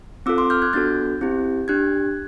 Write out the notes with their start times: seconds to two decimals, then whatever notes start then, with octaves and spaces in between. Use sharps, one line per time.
0.26 C4 F4 A4 D6 E6
0.38 C6 D6
0.50 F6 G6
0.62 F#6 G#6
0.73 B3 D4 F#4 A4 G6 A6
1.21 C4 E4 G4
1.68 D4 G4 F#6 G#6